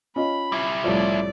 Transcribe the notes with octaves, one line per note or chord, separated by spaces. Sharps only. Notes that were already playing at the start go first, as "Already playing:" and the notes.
C#4 F4 D#5 B5
G3 E4
C2 A2 F3 D5